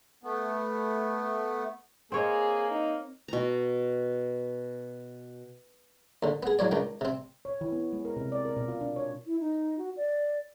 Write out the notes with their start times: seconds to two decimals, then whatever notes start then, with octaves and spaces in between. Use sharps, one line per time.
0.23 A3 B3
2.12 A#3 C4 G#4 C#5 D#5
2.71 D#4
3.28 B2 A#5
6.23 D#2 D3
6.43 B3 G#4
6.59 E2 F#3 C#5 D5
6.71 C#2 D#3 G5
7.01 C3 C4
7.45 C#5
7.61 E3
7.72 B3
7.93 G#3
8.05 A#4
8.17 C3
8.32 D5
8.45 A#4
8.56 B2
8.68 F4
8.81 D4
8.96 C#5
9.26 E4
9.40 D#4
9.78 F#4
9.97 D5